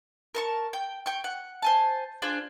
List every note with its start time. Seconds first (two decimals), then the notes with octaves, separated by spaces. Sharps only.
0.35 A#4 A5 C#6
0.73 G5
1.06 G5 C#6
1.24 F#5
1.62 C5 G#5 A5
2.22 D4 F4 G#4 C5